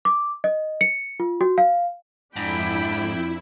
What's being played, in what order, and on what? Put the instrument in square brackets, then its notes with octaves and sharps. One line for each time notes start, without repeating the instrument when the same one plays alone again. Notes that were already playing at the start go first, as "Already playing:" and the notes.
[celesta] D6
D#5
C#7
F4
F#4
F5
[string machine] F2 E4 [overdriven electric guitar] G#2 [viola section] D4 B5 [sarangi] G5